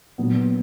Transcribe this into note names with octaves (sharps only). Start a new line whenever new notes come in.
A#2 F#3 B3